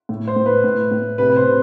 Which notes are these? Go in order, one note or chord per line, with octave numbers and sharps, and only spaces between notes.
A2
C5
A2
B4
A2
A2
C3 B4
B4
C5
C3